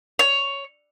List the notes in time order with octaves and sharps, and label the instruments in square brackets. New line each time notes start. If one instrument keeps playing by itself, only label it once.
[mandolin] C#5